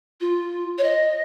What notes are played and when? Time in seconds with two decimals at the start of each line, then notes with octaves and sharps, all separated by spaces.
0.21 F4
0.78 C#5
0.84 D#5